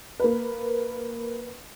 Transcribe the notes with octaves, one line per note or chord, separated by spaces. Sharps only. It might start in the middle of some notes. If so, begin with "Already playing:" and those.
A#3 B4